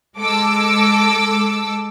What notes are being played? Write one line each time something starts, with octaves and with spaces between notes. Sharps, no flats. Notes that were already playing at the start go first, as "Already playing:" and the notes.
G#3 A4 D6 E6